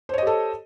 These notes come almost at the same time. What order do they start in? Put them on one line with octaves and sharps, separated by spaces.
C5 C#5 D#5 G4 A4